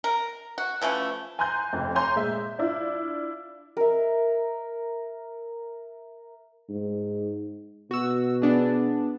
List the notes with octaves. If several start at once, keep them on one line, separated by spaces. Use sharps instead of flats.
A#4
F#4
E3 F3 A3 C#4
G#5 A#5 C6 F#6 G6
F1 F2
C#5 G#5 A#5 C6 G6
A#2 G#3 E5
D4 E4 F4
A#4 E5
G#2
B2 F#4 E6
B3 D4 G#4